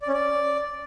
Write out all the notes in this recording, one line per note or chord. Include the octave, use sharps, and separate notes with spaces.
D5
C#4
D5